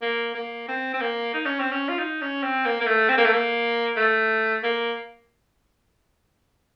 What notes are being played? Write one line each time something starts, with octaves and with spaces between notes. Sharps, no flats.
A#3
A#3
C4
C4
A#3
D#4
C#4
C4
C#4
F4
D#4
C#4
C4
A#3
A#3
A3
C4
A#3
A3
A#3
A3
A#3